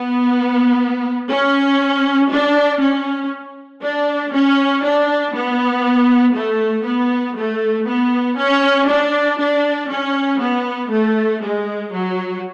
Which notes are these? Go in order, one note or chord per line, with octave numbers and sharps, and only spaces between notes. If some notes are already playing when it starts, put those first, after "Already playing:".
Already playing: B3
C#4
D4
C#4
D4
C#4
D4
B3
A3
B3
A3
B3
C#4
D4
D4
C#4
B3
A3
G#3
F#3